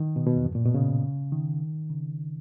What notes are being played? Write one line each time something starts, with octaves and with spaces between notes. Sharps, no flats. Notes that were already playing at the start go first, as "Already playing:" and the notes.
Already playing: D#3
B2
B2
E2
F#2
A#2
B2
C#3
D#3
C#3